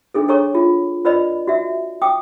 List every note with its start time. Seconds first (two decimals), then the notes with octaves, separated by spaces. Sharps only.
0.14 D4 G#4 A4
0.28 D4 A4 C#5 A#5 C#6
0.55 F4
1.05 F4 B4 D5 D#5 B5
1.48 F#4 E5
2.02 G5 D6 D#6